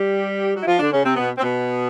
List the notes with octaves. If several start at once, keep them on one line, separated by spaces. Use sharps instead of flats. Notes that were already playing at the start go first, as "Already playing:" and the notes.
Already playing: G3 G4
F#3 F#4
E4
F3 F4
D3 D4
C#3 C#4
C3 C4
B2 B3
C4
B2 B3